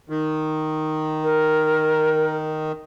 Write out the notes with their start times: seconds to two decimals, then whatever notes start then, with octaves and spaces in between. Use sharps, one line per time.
0.10 D#3
1.24 A#4